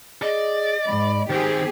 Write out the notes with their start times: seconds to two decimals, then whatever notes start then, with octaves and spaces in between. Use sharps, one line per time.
0.22 G#4 D5 D#5
0.86 G#2 B5
1.30 D#3 C4 G4 G#4 C5